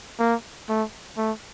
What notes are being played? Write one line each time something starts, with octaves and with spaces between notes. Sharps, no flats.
A#3
A3
A3